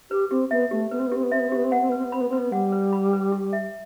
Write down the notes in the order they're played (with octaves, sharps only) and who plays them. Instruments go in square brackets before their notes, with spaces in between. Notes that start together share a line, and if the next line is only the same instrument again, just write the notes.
[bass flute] G4 [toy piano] B4
[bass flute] C4 [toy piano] G4
[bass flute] B3 [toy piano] E5
[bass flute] A3 [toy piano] G4
[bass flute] B3 [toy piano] B4
[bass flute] C4
B3
[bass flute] C4 [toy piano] G4
[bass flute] B3
[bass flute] C4 [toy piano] E5
[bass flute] B3
C4
[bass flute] B3 [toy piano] G4
[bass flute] C4
[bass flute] B3 [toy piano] F#5
[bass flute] C4
[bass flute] B3 [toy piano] B4
[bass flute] C4
B3
[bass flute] C4 [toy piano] B5
[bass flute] B3
[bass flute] C4 [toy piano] B4
[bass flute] B3
[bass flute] G3 [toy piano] F#5
[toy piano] B4
B5
B4
G4
E5